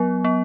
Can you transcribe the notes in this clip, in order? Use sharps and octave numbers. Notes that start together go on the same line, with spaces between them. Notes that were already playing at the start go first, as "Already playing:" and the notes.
Already playing: F#3 B3
B3